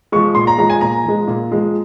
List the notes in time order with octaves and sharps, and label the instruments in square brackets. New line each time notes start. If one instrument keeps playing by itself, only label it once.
[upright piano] F3 G#3 C#6
A#2 C6
A#5
F3 G#3 A#5
G#5
A#2 A#5
F3 G#3
A#2
F3 G#3